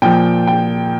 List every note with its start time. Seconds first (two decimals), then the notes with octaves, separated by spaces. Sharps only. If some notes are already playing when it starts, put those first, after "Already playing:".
0.02 A#2 F3 G5
0.47 G5